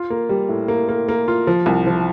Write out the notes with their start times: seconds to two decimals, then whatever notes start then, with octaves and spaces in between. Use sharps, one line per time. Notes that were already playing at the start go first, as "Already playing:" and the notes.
Already playing: F4
0.10 A#3
0.29 G3
0.49 A2
0.68 A#3
0.89 A#3
1.08 A#3
1.28 F4
1.47 F3
1.66 C2
1.87 F3